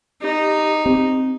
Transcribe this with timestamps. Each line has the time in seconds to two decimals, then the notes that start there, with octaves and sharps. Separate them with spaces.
0.22 D#4 G4
0.86 C4